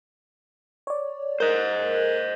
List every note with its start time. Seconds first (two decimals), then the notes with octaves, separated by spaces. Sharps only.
0.87 C#5 D5
1.40 A#4 C5 D#5 F#6